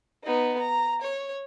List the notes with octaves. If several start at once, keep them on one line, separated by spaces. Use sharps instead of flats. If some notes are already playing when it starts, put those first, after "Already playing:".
B3 D#4
A#5
C#5